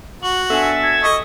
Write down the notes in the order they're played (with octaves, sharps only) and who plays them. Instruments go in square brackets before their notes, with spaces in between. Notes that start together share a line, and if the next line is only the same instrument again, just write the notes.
[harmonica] F#4 [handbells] C#6 [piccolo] F#7
[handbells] B3 D4 G#5 [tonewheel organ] A4 E5
[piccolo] G#6
[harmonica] D#5 C#6